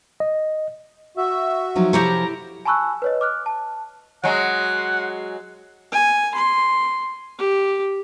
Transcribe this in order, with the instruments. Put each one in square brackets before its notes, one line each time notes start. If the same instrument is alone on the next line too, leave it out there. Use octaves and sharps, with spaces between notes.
[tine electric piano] D#5
[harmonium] F#4 E5 [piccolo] E6
[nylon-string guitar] F3 F#3 D#4
[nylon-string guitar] C3 F3 [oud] E4 G4 C#5 [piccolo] A#5
[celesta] G#5 A5 B5 C#6 E6 F#6
B4 C#5 D#5
D6 F6 F#6
A5
[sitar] F#3 G#3 [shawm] F#5
[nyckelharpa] G#5
C6
G4